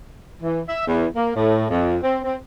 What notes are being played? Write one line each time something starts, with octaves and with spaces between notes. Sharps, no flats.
E3
E5
E2
A#3
A2
F2
C4
C4